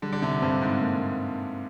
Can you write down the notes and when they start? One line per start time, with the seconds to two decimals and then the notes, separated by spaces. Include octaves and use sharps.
0.02 D3 G3
0.12 D3
0.22 C3
0.42 G2 C4
0.61 G#2
0.82 A#3